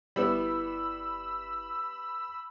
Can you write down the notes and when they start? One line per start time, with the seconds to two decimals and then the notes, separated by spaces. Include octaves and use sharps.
0.16 G1 G3 B3 E4 B5 E6